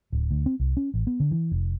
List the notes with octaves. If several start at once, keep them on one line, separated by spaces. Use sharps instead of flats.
D1
D2
C4
C2
C#4
A1
B3
D3
E3
F1